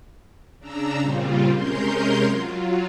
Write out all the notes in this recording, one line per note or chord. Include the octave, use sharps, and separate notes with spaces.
C#3 D4 A#5 E6
A#2 C#3 G3 C4 F4
C3 G#3 C#4 A#4 C6 G6
F#3 F4